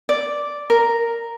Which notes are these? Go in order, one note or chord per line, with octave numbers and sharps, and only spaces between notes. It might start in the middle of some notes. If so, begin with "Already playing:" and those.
D5
A#4